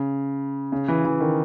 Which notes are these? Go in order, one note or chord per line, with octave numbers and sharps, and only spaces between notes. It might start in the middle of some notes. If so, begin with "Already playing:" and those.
Already playing: C#3
C#3
E3
E3
D#3